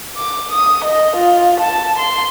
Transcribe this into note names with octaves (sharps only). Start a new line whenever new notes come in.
D6
D#6
D#5
F4
A5
C6